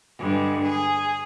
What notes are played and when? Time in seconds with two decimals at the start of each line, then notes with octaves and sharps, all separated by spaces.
0.18 G2 D3 G#3
0.62 G#4